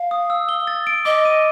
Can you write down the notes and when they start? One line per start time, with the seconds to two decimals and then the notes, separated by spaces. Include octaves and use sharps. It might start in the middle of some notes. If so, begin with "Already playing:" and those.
Already playing: F5
0.11 D#6
0.30 E6
0.49 G7
0.67 A6
0.87 D7
1.05 D#5 D6
1.25 D#7